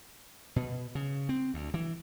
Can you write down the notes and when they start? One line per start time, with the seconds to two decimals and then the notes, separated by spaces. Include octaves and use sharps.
0.56 B2
0.95 C#3
1.29 C4
1.54 D2
1.74 E3